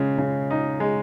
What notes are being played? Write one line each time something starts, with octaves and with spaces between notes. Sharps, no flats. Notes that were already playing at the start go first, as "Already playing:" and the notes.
Already playing: C#3 G#3
C#3
D#4
G#3